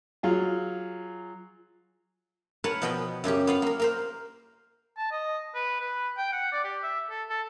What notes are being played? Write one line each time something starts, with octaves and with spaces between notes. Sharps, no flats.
F#3 F4 G#4
A#4 B4 C#5 F#5 A5
B2 F3 B3 F#4 D#5 G5
F#2 C#3 C#4 G4
B3 F4 F5
A#3 A#4
A#3 A#4 C5
A5
D#5
B4
B4
G5
F#5
D5
G4
E5
A4
A4